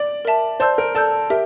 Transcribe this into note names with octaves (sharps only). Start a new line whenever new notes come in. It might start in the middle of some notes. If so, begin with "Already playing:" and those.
Already playing: D5
A#4 E5 A5
C5 D5 A5 E6 G6
A#4
A4 D5 A5 E6 G6
G4 A#4 E5